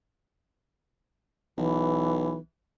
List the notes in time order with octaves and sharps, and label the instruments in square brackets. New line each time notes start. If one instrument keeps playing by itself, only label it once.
[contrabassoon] B1 [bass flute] E3